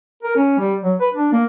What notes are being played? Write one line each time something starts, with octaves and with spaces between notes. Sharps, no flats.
A#4
C#4
G3
F#3
B4
D4
A#3